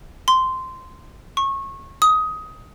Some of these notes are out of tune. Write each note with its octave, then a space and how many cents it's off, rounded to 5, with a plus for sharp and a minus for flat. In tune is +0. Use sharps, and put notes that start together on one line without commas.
C6 -10
C#6 -25
D#6 +15